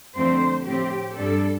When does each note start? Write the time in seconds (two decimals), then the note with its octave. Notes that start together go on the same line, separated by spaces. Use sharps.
0.16 F2 D3 A3 C4 C5
0.66 A2 F3 C4 G4
1.17 G2 G3 D4 A4